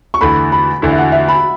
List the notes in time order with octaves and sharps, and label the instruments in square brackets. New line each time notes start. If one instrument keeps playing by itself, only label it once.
[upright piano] C#6
[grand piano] E2 D3 A3 E4 [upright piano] B5
[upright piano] B5
[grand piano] E2 D3 A3 E4
[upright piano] E5
F#5
E5
B5